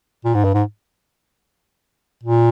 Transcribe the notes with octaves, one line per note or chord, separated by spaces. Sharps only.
A#2
G#2
G2
G#2
A#2